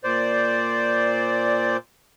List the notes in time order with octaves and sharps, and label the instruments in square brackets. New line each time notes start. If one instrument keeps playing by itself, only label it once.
[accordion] A#2 C5 D5